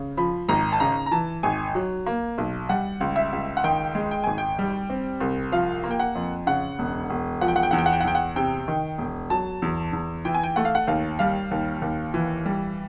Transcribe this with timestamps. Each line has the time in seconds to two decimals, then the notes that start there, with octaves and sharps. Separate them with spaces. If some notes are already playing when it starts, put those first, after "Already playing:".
Already playing: C#3
0.17 F3 B5
0.48 G#1 A#5
0.72 A5
0.80 C#3 A#5
1.06 A#5
1.12 E3 A5
1.43 G#1 G#5
1.75 F#3
2.06 A#3
2.38 B1
2.69 G3 F#5
3.01 C#2
3.16 E5
3.33 C#2
3.57 F#5
3.64 D#3 G5
3.95 G#3
4.11 G5
4.24 G#1 G#5
4.38 G5
4.59 G3
4.90 C4
5.20 C2
5.52 F3 F5
5.84 A#3
5.91 G5
6.00 F#5
6.15 F2
6.47 C#3 F#5
6.79 E1
7.10 E1
7.41 F3 F#5
7.48 G5
7.56 F#5
7.63 G5
7.71 E2 F#5
7.78 G5
7.86 F#5
7.93 G5
8.00 F#5
8.05 E2 G5
8.15 F#5
8.36 C3 G5
8.68 D#3
8.98 E1
9.30 F#3 A5
9.62 E2
9.93 E2
10.25 E3 G5
10.34 G#5
10.43 G5
10.56 A3 F#5
10.65 F5
10.75 F#5
10.87 D#2 F5
11.19 G3 F5
11.51 D#2
11.82 D#2
12.14 E3
12.45 G3